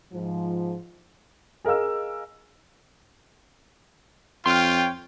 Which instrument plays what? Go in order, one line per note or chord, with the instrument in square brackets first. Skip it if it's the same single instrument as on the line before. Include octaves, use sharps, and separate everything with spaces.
[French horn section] G#2 F3
[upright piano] G#4 A#4 D#5 F5 E6
[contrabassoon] F2 [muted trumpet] F4 [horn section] C#5 G5 [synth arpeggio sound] C6 F6